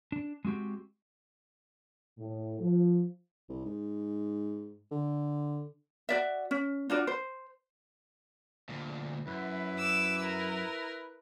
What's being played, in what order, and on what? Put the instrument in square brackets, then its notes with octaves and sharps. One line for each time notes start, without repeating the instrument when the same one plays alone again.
[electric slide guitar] D4
G#3 C4 F#4 G4
[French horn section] A2
F3
[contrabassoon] C2
G#2
D3
[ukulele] F#4 D5 E5
C#4
D4 F4 F#4 D5
C5
[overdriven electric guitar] D2 A#2
[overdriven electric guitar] F#2 [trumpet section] E4 B4
[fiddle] D6 E6
A#4